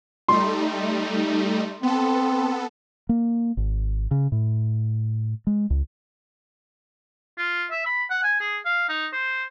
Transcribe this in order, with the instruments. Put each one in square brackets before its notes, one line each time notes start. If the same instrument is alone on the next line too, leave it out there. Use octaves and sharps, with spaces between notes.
[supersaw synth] G3 A3 D#4 [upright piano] C6
[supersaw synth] B3 A4 [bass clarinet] C4
[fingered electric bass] A#3
G#1
C#3
A2
G#3
C#2
[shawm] F4
E5
B5
F#5
G#5
G#4
F5
D#4
C5